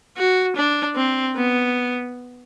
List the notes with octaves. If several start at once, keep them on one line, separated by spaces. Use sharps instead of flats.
F#4
D4
C4
B3